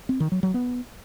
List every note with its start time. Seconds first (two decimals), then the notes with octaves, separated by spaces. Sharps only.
0.09 C4
0.20 D#3
0.32 F#3
0.43 F#3
0.54 B3